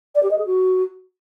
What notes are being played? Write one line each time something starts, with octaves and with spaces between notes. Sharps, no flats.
D5
G4
D#5
G#4
F#4